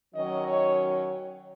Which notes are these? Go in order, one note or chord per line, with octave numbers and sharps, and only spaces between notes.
D#3 F#3 C#4 D#5
C#5